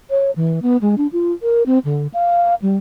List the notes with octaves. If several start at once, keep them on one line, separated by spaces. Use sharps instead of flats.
C#5
E3
B3
G#3
D4
F4
A#4
C4
D3
F5
G3